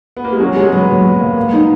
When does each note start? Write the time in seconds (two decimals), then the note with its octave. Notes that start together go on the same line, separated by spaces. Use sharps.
0.17 B3
0.24 A#3
0.33 G#3
0.40 F#3 C#4
0.56 G#3 C#4
0.72 F#3 B3
0.89 F#3
1.04 F#3
1.21 A#3
1.37 A#3
1.53 D#4